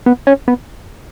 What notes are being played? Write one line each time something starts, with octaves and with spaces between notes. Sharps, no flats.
B3
C#4
B3